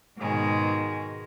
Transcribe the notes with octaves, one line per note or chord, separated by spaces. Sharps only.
G#2 B2 D#3 G#3